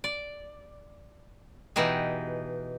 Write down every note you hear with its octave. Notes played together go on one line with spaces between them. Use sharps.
D5
B2 E3 D#4 G4 G#4